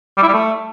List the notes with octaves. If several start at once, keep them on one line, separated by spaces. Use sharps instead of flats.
G3
E4
G3
A3